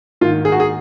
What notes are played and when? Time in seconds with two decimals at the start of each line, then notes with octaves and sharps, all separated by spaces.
0.21 G#2 D#3 A#3 F4
0.45 G#4
0.52 F#4
0.60 G#4